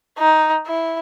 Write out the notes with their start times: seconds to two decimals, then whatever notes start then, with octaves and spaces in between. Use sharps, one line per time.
0.18 D#4
0.66 E4